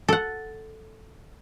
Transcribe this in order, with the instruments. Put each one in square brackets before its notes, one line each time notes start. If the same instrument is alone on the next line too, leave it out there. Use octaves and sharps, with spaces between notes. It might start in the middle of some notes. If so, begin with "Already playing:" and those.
[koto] A4 F#5